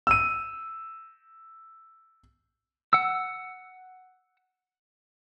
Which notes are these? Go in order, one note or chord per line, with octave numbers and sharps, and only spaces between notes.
E6 D#7
F#5 E6